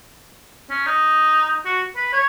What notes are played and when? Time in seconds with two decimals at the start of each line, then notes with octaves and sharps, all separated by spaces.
0.70 C#4
0.87 D#4
1.65 F#4
1.96 B4
2.13 C#5